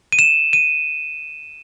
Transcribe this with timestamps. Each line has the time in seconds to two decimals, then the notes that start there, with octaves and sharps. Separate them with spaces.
0.12 D#7
0.19 E7
0.53 D#7